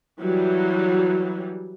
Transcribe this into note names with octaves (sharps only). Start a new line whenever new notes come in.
E3 F#3 G3